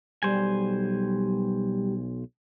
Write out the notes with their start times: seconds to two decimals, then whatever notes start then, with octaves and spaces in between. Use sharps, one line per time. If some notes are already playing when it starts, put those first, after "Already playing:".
0.23 B1 G3 C5 G#5